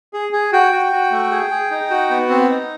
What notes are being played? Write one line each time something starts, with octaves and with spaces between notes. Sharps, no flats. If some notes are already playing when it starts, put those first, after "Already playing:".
G#4
G#4
F#4 G5
F#4
F#4
A3
G#4
G#4
D#4
F#4
B3
C4
D#4